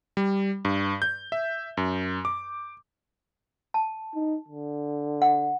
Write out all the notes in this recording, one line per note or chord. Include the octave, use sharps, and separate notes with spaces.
G3
G2
G6
E5
F#2
D6
A5
D#4
D3
F#5